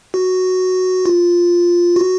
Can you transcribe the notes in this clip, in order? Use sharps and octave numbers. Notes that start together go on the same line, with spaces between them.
F#4
F4
F#4